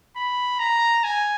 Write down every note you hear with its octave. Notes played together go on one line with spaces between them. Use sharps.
B5
A#5
G#5